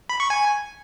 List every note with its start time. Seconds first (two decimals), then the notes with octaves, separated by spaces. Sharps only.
0.10 B5
0.20 C#6
0.30 G#5